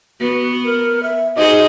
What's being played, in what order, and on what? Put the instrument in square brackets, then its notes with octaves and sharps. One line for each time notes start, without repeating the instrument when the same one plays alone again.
[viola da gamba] B3 [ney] F#4
[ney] A#4
E5
[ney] D#4 [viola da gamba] F#4 G#4 C5 [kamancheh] D#5